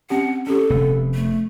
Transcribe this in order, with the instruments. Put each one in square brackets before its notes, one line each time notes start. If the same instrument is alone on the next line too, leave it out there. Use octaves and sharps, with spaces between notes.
[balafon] C4 C#4 G4 [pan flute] F#5
[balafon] C#4 G4 [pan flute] A4
[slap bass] F1 C3 B3
[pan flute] A3